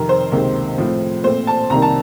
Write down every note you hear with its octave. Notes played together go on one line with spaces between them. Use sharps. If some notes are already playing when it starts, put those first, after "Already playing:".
Already playing: F2 C3 D#3 A#4
C5
C#2 C3 D#3 A#3
A2 F3 C4
A#2 A3 C4 C5
A5
C2 C3 D#3 A#3 A#5
A5